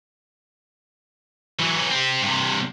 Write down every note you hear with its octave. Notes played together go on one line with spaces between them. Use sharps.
E3 F#3
C4 G4
G2 C3